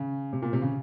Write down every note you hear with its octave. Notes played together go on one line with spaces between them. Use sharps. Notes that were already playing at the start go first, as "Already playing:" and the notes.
Already playing: C#3
C3
A#2
C3
C#3